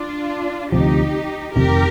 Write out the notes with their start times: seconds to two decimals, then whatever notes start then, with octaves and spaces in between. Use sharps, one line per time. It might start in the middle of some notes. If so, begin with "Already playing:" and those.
Already playing: D4 F4
0.72 D2 C3 F3 D#4 G4
1.55 F1 F2 C3 D#3 G4 A#4